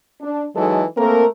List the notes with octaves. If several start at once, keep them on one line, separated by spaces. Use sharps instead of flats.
D4
E3 F#3 G#3 D#4 A4
A3 A#3 C4 A4 A#4